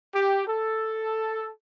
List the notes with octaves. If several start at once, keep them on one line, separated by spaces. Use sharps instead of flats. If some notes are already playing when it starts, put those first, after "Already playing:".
G4
A4